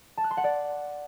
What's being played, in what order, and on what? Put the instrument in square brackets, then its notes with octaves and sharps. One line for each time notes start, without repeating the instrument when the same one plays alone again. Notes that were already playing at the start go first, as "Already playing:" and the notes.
[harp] A5
F#6
C6
F#5
D5